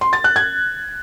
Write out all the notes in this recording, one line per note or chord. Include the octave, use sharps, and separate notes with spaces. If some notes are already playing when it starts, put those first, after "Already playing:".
C6
A6
F#6
G#6